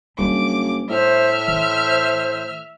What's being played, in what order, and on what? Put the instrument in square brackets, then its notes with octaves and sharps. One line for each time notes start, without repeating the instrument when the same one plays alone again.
[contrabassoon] F#1 [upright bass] G3 D4 [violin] D6
[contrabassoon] A2 [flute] C5 [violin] E5 F6
[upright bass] E3 [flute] C5